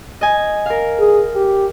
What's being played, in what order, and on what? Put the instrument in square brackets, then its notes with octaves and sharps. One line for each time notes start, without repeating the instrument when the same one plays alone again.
[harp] D#5 G#5
A#4 F5
[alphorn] G#4
G4